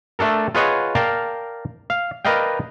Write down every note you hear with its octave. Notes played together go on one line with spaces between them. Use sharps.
A3 D4 A4 A#4
F4 G#4 B4 C#5 D#5 F#5
A#4 D5 F5 G5 A5
F5
A#4 B4 D5 D#5 F5 G5